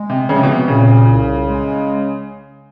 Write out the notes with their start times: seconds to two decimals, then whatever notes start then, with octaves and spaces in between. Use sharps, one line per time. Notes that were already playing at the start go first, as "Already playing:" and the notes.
Already playing: G#3
0.10 C3
0.28 C#3 F3
0.36 C3
0.43 B2
0.50 C3
0.68 A#2 C#3
1.08 C2
1.47 G#3